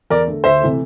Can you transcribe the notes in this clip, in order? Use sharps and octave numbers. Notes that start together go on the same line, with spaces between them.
E2 A#4 D5
D3 A3
D2 C5 E5
C3 E3 A3